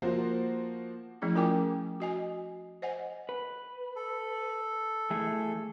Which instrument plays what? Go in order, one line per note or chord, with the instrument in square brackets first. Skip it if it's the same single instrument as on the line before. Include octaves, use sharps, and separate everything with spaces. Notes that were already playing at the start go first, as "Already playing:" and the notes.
[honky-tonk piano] F3 A#3 F#4 C5
[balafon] F3 A3 C#4 E4 G#4
C#4 F4 A#4 G5 G#5 D6
F#4 D#5 G#5
C5 D#5 F#5 G#5
[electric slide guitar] B4
[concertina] A4
[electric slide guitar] E3 A3 G#4